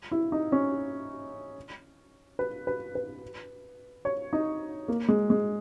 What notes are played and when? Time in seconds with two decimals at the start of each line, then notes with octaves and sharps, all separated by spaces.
0.11 E4
0.32 D#4
0.52 C#4
2.39 B4
2.67 B4
2.95 B4
4.05 C#5
4.33 D#4
4.88 A#3
5.08 G#3
5.30 G#3